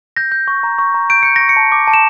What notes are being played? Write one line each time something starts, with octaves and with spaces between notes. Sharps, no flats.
G6 A#6
G6
C#6
A#5
C#6
A#5
G6 D7
G6 C#7
A#6
C#6
C#7
A5
D6
A5
E7